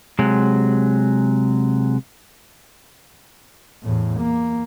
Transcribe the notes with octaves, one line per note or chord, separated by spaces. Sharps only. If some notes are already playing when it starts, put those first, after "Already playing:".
C3 F#3 G#3
E2 A2
A#3